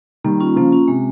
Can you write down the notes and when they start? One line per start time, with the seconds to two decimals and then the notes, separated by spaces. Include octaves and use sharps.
0.24 D#3 G3 A#3
0.40 C#4 F4
0.56 C#3 F3 A#3
0.72 C#4 F4
0.88 C3 G#3